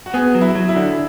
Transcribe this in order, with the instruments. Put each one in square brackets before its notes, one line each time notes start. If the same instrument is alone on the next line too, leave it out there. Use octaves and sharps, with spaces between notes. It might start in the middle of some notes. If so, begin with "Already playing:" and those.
[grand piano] F#4
[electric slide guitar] B3 [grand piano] G#4
[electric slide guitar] F#3
[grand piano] E4
[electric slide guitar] F#3
[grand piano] E4
[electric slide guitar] D3